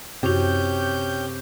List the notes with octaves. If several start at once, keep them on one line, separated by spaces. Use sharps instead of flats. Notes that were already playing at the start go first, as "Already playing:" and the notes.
F#2 C3 C#4 F#4 G4 G6